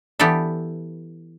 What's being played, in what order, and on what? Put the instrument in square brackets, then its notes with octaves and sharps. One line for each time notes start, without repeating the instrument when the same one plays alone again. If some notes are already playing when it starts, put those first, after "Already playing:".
[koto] E3 B3 G4 A4 D5 E5